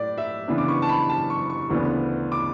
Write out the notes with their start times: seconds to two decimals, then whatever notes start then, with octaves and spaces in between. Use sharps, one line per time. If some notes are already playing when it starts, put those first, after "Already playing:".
Already playing: A2 D5
0.18 E5
0.48 C#3 E3 B3 D4
0.58 D6
0.68 C#6
0.82 A5
0.89 B5
1.09 A5
1.30 C#6
1.50 C#6
1.70 D2 C#3 E3 B3 D4
2.32 D6